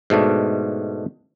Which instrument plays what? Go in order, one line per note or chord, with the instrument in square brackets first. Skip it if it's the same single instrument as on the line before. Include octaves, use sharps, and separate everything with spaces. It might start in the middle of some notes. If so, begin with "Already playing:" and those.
[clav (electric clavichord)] G#2 B2 A3 D4